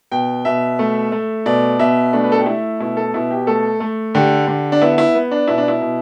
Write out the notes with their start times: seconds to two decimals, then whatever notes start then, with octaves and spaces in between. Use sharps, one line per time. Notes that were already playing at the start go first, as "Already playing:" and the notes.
0.11 B2 G5
0.45 B2 E5
0.79 A3
1.12 A3
1.46 B2 D5
1.79 B2 E5
2.13 A3 D4
2.24 B4
2.32 A4
2.39 G4
2.46 A3 E4
2.80 B2 E4
2.97 A4
3.14 B2 E4
3.30 G4
3.47 A3 A4
3.80 A3
4.14 D3 G4
4.47 D3
4.72 D4
4.81 B3 E4
4.98 E4
5.15 B3
5.31 D4
5.48 B2 E4
5.58 D4
5.68 E4
5.81 B2